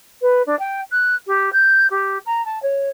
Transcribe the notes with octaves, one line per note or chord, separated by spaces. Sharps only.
B4
D4
G5
F#6
G4
G6
G4
A#5
A5
C#5